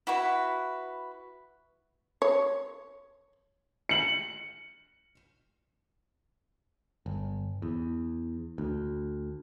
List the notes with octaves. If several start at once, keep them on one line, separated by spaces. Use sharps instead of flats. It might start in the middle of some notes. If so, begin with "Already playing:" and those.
E4 F#4 B4
C#5
C#7 F#7
G1
E2
D2